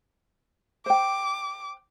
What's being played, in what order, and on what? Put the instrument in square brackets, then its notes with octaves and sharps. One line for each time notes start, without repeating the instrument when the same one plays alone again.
[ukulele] C5 G5 [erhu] D6